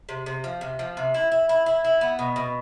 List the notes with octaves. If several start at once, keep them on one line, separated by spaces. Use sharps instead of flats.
C3
C3
F3
C3
F3
C3
E4
E4
E4
E4
E4
B3
B2
B2